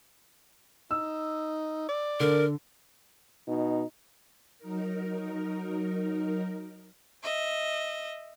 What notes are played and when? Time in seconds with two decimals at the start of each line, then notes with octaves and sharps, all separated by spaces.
0.91 D#4 E6
1.89 D5
2.20 D3 A#4
3.48 B2 D#4
4.59 F#3 D#4 A#4
7.23 D#5 E5